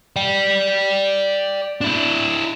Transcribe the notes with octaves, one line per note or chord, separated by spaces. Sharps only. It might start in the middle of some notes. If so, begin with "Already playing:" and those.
D5 G5
D4 E4